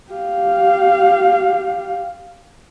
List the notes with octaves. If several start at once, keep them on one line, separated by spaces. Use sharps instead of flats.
G4 F5